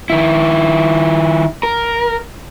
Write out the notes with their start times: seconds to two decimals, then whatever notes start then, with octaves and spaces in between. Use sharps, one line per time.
0.10 D#3 E4
1.63 A#4